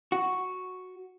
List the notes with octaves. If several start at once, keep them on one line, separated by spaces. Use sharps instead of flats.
F#4